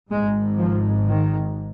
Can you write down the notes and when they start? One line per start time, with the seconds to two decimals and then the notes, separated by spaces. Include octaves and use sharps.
0.10 G#1 G#2 G#3
0.58 F3
1.05 D#3